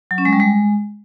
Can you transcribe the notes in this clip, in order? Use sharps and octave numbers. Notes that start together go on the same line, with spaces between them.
F#3
C#4
G#3
G3
G#3